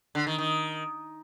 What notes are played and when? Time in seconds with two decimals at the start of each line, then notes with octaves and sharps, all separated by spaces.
0.15 D3
0.27 D#3
0.38 D#3